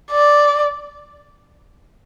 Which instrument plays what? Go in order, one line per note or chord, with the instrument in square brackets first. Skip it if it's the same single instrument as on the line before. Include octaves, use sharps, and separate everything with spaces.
[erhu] D5